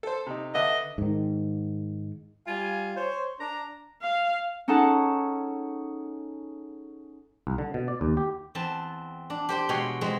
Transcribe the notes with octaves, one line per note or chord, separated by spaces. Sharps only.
A4 C5
C3 D#4
D3 B4 D#5 E5
G#2 D#3
G3 F4 G#5
C5 C#5
D4 A#5
F5
C#4 D#4 G#4 A4 F#5 A5
C2
D3
B2
D5
D#2
G4
E2 C4 A5
D4
G4 C5 G5
B2 G#3 C#5 G5 C6
E3 G#3 C4